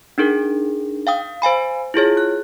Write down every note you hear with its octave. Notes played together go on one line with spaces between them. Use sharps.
D4 D#4 G#4 A#4
F5 G5 D#6
C5 F5 G#5 B5
E4 F4 G#4 C#5
F#6